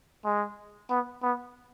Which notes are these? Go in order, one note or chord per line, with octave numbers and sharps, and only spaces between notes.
G#3
B3
B3